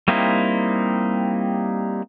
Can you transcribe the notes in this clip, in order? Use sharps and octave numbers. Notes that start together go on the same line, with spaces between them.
G3 A#3 C4 D#4 E4